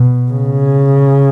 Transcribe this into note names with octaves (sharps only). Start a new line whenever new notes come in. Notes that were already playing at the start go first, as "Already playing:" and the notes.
Already playing: B2
C#3